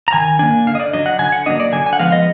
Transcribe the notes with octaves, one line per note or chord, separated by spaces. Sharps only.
A#5
D#3 G#5
A#3 D4 G#5
D3 F5
D#5
D5
F#3 D4 D#5
F#5
D3 G#5
F#5
F#3 A#3 D4 D#5
D5
D3 G#5
G#5
F#5
F3 G#3 B3 F5
D#5